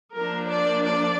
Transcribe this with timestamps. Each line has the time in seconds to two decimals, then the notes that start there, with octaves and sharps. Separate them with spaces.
0.15 F3 A#3 D4 A#4
0.50 D5
0.84 D5